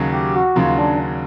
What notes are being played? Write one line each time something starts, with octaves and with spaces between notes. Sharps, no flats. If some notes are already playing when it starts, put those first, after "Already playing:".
Already playing: D#2 C#3 F#3
G4
F#4
D#2 C#3 F#3 F4
D4